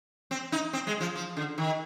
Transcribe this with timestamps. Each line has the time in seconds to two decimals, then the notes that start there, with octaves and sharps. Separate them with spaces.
0.31 C4
0.52 D#4
0.73 C4
0.87 G#3
1.00 F3
1.15 F3
1.37 D3
1.58 D#3